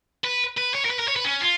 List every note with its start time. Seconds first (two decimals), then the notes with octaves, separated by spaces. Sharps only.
0.25 B4
0.58 B4
0.75 C#5
0.85 A#4
0.91 B4
0.99 A#4
1.08 C#5
1.16 B4
1.24 C#4
1.41 F4